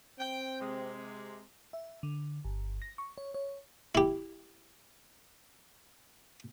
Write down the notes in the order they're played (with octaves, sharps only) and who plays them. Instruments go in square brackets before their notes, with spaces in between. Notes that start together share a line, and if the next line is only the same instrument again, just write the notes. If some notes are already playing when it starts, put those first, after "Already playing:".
[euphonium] C4 [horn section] G5
[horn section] C3 G#3
[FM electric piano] E5
D3
G1
A#6
C#6
C#5
C#5
[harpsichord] E4 G4